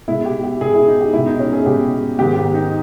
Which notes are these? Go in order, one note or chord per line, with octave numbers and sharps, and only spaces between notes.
B2 G#3 E4
G4
G4
B2 G#3 G#4
E4
D#4
G4
B2 G#3 E4
D#4
C#4
G#4
B2 G#3 G4
G#2 D#3 G#3 G4
G4
D#4